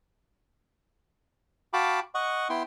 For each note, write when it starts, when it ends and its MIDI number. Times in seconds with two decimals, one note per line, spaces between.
1.73 2.00 66
1.73 2.00 77
1.73 2.00 79
1.73 2.00 81
1.73 2.00 83
1.73 2.00 86
2.15 2.48 75
2.15 2.48 78
2.15 2.48 85
2.50 2.63 59
2.50 2.63 64
2.50 2.63 79
2.50 2.63 84